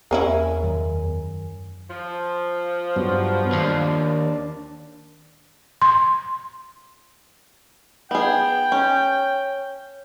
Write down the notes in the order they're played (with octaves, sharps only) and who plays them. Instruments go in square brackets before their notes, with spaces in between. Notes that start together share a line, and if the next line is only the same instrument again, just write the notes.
[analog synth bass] E2 [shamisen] A#3 C#4 E4 [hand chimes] A#4 G#5
[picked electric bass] F#2 D#3
[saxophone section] F3
[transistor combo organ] G2 F#3 B3
[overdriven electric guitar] D#2 [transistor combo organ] D4
[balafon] C6
[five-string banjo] B3 G#4 [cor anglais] G5
[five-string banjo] C#4